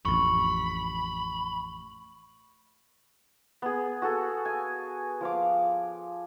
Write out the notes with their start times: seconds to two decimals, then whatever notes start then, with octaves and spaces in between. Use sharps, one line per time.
0.05 A1 F2 B5 C#6
3.62 B3 G#4
4.02 F#4 G#4 A4
4.45 G#5
5.21 F3 F5 D6